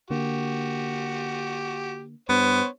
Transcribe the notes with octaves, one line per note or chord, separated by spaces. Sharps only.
D3 A#3 F#4 G4
G2 B3 C5 C#5